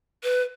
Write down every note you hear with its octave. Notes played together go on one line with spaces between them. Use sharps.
B4